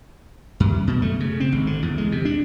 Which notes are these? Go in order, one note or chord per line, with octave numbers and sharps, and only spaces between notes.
F#2
B2
A3
C#3
C4
G#1
D3
E2
G#3
C3
D4